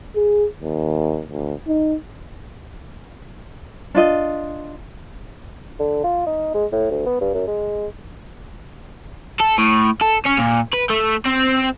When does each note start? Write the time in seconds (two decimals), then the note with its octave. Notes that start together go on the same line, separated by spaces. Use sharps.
0.16 G#4
0.62 D#2
1.29 D2
1.67 D#4
3.95 D4 F4 D#5
5.79 D3
6.04 F4
6.26 D#4
6.54 G#3
6.72 A2
6.91 D2
7.06 B3
7.21 G2
7.34 F#2
7.47 G#3
9.40 A4
9.58 A2
10.02 A4
10.26 C#4
10.38 A#2
10.74 B4
10.90 A3
11.26 C4